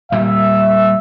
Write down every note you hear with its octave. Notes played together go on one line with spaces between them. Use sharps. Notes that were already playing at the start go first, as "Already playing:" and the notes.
A#2 G3 E5